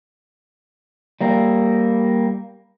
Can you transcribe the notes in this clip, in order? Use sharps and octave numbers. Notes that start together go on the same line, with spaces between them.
G3 A#3